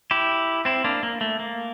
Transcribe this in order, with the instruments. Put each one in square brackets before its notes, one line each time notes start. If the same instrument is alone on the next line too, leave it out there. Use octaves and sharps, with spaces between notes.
[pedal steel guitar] E4 G4
C4 E4
A#3 D4
A#3
A3
A#3